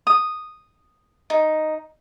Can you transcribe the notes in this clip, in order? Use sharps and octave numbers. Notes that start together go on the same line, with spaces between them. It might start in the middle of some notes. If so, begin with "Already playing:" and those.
D#6
D#4